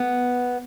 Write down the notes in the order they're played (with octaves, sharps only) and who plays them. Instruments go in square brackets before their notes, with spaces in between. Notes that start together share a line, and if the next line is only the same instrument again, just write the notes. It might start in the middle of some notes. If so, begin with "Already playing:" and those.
Already playing: [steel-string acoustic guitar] B3